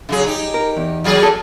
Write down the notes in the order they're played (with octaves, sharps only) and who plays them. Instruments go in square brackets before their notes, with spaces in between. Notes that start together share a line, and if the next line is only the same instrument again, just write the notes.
[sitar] C#3 F#3 G#4
D#4 G4
[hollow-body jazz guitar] A#4
E2
[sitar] A#2 F#3 G#4
[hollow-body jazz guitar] A4